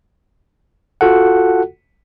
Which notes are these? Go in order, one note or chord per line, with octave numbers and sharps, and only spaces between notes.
F4 F#4 A4 F#5